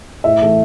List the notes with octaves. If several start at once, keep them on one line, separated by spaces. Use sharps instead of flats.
A2 E5
E3 A3